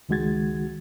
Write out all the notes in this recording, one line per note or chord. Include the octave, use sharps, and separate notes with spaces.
C#2 D#3 G#3 F#4 G#6 A6